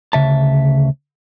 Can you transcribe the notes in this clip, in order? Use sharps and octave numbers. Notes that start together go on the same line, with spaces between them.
D2 C#3 E5 A5